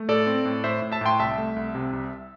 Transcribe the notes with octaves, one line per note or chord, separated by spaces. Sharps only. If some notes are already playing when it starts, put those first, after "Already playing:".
Already playing: A3
A2 A4 D5
C4
A2
A2 C5 E5
A2
E5 A5
A2 G5 C6
C2 E5 A5
A3
C2
C3
C2